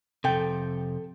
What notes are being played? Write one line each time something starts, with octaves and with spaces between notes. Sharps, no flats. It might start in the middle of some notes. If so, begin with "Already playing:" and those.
F2 C3 A4 G5